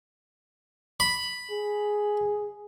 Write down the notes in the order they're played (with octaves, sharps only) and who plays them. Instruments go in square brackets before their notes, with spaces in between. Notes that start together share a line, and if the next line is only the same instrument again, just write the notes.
[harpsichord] B5
[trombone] G#4